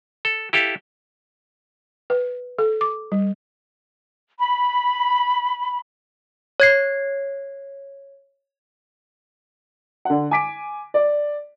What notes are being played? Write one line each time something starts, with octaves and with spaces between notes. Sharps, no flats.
A4
E4 G4 A4 F5
B4
A4
D6
G3
B5
C#5 G#6 C7
D3 F#5
G#5 D6 B6 D7
D5